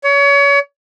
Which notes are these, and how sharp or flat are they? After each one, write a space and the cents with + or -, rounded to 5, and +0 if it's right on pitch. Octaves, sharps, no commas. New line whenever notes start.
C#5 +30